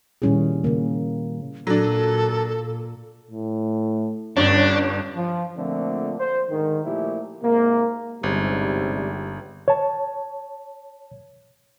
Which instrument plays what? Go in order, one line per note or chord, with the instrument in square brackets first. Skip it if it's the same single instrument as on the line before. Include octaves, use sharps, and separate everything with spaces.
[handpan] A#2 D#3 G3 C#4 E4 G#4
C#3 A#3
[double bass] A#2 [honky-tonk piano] F#3 D4 [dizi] A4
[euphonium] A2
[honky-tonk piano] G1 G2 C#5 [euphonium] C#4 [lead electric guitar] D4
[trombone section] F3
A#2 D3 F3 A3 C4
C5
G#2 D3 D#3
A#2 F3 A3 E4 G4
G#2 C3 A#3
[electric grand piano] G1 [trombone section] G#2 C3 G3
[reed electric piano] C#5 A5